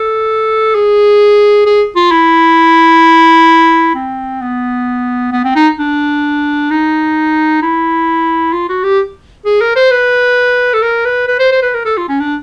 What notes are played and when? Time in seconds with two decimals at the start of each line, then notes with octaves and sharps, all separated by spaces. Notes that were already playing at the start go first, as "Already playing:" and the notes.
Already playing: A4
0.75 G#4
1.66 G#4
1.96 F4
2.11 E4
3.95 C4
4.42 B3
5.32 B3
5.45 C4
5.56 D#4
5.79 D4
6.71 D#4
7.62 E4
8.53 F4
8.69 F#4
8.84 G4
9.45 G#4
9.61 A#4
9.76 C5
9.91 B4
10.74 A4
10.83 A#4
11.05 B4
11.28 B4
11.40 C5
11.52 C5
11.62 B4
11.74 A#4
11.85 A4
11.97 F4
12.09 C#4
12.20 D4